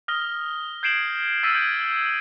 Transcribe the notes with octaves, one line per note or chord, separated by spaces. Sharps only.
D#6 F6 A#6 G7
G6 G#6 C7 D7 E7 F#7
E6 F6 A6 B6 D#7
G6 G#6 D7